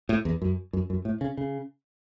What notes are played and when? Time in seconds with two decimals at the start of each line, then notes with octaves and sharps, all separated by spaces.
0.09 A2
0.25 E2
0.42 F#2
0.73 F#2
0.90 F#2
1.05 A2
1.21 C#3
1.37 C#3